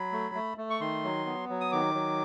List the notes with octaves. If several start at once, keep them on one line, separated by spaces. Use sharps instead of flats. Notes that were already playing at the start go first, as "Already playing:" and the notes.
Already playing: F#3 B5
A3
A3
A3
C#6
D#3 C6
F#3
B3
F#3
D#6
D#3 D6
F#3